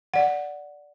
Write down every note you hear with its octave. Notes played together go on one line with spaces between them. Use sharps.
D5 F#5